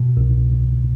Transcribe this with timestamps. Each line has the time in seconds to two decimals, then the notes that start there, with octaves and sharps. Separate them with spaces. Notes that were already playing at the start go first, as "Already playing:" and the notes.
Already playing: B2
0.17 C2